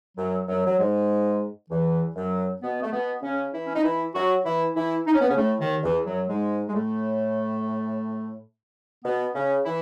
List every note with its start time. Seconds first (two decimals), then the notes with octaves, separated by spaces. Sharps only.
0.17 F#2 F#3
0.47 F#2 F#3
0.67 F#3
0.79 G#2 G#3
1.71 E2 E3
2.16 F#2 F#3
2.62 B2 B3
2.83 A3
2.93 B2 B3
3.23 C#3 C#4
3.54 E3 E4
3.67 C#4
3.76 D#4
3.84 E3 E4
4.15 F#3 F#4
4.46 E3 E4
4.76 E3 E4
5.07 D#4
5.14 C#4
5.21 B3
5.30 C#3 C#4
5.37 A2 A3
5.61 D#2 D#3
5.83 E2 E3
6.06 F#2 F#3
6.29 G#2 G#3
6.69 G#3
6.75 A2 A3
9.05 B2 B3
9.35 C#3 C#4
9.65 E3 E4